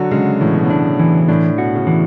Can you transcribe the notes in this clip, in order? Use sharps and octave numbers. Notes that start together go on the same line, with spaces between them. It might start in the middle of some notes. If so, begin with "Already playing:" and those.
Already playing: D3 F#3 F#4
C#3 G#3
A2 E3
B2
A2
D4
E3
A2 D4
B2 F#4
C#3
D3 E3